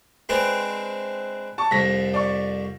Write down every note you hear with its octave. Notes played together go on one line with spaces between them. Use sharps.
G#3 C4 D4 B4
A5 C#6
C2 F2 A#6 B6
D5 C#6